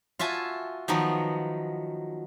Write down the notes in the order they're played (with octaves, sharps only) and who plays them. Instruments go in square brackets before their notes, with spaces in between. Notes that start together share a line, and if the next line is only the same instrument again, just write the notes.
[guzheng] F4 F#4 E5 G#5 A5
D#3 F3 F#3 B3